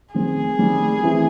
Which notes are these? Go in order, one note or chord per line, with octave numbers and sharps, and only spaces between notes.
D#3 G3 C4 G#4
D#3 G3 C4
E3 A3 C4 E4